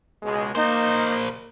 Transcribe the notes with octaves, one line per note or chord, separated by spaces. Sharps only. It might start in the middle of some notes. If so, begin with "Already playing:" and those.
C#2 B2 G#3
A#3 D#4 A#4 C5